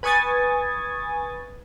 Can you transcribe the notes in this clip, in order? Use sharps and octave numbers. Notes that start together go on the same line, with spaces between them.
B4 G#5 C#6 D#6 G#6 A6